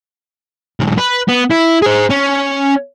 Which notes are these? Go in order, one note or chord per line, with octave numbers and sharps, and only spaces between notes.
B1 G#2
B4
B3
E4
G#4 C5
C#4